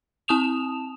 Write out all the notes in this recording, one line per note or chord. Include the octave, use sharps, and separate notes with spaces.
C4 A5 D#6 E7 F7